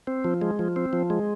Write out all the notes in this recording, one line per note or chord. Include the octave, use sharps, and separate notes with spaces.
C4
F3
G#3
F3
C4
F3
G#3